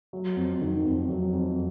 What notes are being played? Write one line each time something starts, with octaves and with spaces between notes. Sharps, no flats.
F#3
F2
D#3
F2
F#3
F2